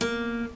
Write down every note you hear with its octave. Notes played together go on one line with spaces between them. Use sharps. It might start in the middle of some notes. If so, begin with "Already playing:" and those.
A#3